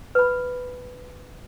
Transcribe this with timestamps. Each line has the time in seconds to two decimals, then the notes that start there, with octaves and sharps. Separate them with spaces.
0.15 B4 B5